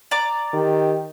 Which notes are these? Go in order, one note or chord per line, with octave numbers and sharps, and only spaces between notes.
D5 A#5 D6
D#3 G4